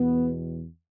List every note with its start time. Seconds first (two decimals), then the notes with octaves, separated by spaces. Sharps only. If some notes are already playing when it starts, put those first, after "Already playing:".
Already playing: E2 B2 B3